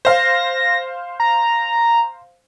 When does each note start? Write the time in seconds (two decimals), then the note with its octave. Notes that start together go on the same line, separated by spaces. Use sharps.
0.05 C5 F5 A#6
1.20 A#5